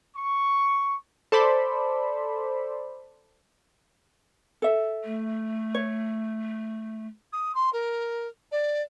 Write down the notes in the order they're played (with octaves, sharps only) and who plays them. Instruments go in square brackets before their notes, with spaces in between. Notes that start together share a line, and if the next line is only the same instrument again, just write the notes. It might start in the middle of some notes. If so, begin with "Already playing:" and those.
[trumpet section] C#6
[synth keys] A4 C5 D5 B5
[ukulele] A4 E5
[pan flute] A3
[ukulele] C#5
[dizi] D#6
C6
A#4
D5